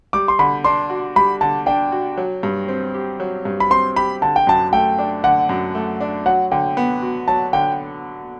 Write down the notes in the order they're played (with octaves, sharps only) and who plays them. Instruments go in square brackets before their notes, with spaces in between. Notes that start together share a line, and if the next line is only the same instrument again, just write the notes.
[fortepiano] G3 [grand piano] D6
[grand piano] C6
[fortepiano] D3 [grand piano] B5
[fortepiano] D4 [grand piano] C6
[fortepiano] F#4
[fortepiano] G3 [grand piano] B5
[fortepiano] D3 [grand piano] A5
[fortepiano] D4 [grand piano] G5
[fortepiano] F#4
F#3
G2
C4
G4
F#3
G2
[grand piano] B5
[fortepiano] C4 [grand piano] C6
[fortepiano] G4 [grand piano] B5
[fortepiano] D3 [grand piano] A5
[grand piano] G5
[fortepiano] F#2 [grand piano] A5
[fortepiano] A3 [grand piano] G5
[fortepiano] D4
[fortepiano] D3 [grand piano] F#5
[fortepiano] F#2
A3
D4
[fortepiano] F#3 [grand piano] F#5
[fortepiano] D3 [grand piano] G5
[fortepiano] B3
F#4
[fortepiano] F#3 [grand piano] A5
[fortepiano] D3 [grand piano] G5